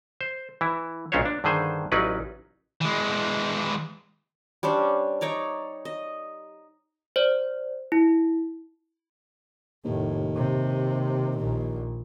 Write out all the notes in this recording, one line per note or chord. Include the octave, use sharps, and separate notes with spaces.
C5
E3 E4
B1 A#2 C#4 D4 C5 C#5
D4
G2 D3 D#3 G#4 C5 G#5
A1 F#3 C#4 D#4 B4 D5
E3 G#3
G3 C#4 D4 C5
D#4 C#5 D5 A#5
D#5
C5 D5
E4
F1 D#2 A2
C3
A#1 A#2